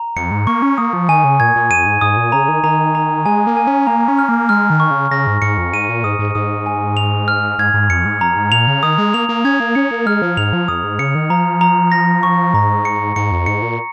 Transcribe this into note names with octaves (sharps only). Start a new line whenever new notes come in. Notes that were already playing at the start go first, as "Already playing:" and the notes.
Already playing: A#5
F2 C#7
G#2
A#3 C#6
C#4
A#3 D#6
F3
D#3 G#5
C#3
A#2 G#6
A#2
F2 D#7
G#2
G#2 D#6
A#2
C#3 A#5
D#3
D#3 A#5
A#5
G#3 G#5
A#3
G#5
C#4
A#3 A#5
C#4
F6
A#3
G#3 F6
D#3
C#6
C#3
C#3 A#6
G#2
G#2 C#7
F2
G#2 D#7
A#2
G#2 D#6
G#2
G#2 D#6
G#5
F7
F6
G#2 G#6
G#2
F2 C#7
G#2
F2 A#5
G#2
A#2 F7
C#3
D#3 D#6
G#3
A#3 F7
A#3
C#4 G#6
A#3
C#4 C#7
A#3
G#3 F6
F3
G#2 F7
F3
F2 D#6
G#2
C#3 C#7
D#3
F3 A#5
A#5
A#6
C#6
G#2 A#5
C#7
G#2 C#7
F2
G#2 C#7
A#2